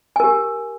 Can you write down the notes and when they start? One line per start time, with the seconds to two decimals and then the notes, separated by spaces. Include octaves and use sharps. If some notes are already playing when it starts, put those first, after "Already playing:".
0.16 G#5
0.20 A#4
0.24 G4